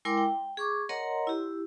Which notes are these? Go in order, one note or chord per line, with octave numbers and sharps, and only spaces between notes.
G#3 E4 A#4 G5 C6 D6
G5
G#4 C#6 D6
A#4 C#5 D#5 F#5 A#5 C6
E4 G4